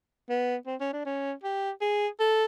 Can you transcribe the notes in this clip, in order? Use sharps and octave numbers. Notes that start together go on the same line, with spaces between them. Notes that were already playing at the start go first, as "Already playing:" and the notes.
B3
C4
C#4
D4
C#4
G4
G#4
A4